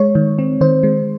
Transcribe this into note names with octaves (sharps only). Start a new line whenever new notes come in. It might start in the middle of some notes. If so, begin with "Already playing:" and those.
Already playing: G#3 C#5
D#3
C4
D#3 C5
G#3